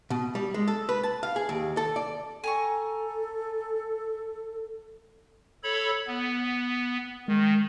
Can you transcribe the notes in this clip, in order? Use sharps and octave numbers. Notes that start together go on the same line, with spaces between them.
B2
G3
G#3
A4
B4
A5
F5
G#4
D#2
A4
D5
A4 G#5 A#5 C#6
A4 C#5 B5
B3
D#3 G#3